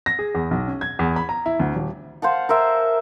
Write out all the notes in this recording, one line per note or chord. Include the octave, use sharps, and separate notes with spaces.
A#6
G#4
E2
B1
C#4
G#6
E2
B5
A#5
E4
D2
D#1
C5 F5 F#5 A5
A#4 C5 E5 G#5